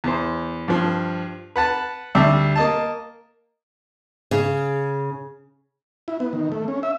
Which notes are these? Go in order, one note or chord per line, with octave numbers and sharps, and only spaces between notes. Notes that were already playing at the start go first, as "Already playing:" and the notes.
E2 C5
G2 F3
B4 F#5 A5
D2 G3 E5 D6
A#3 D#5 A5
C#3
E4
B3
D#3
A3
C#4
E5